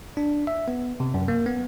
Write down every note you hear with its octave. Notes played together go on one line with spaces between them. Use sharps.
D4
E5
B3
C3
F#2
A#3
B3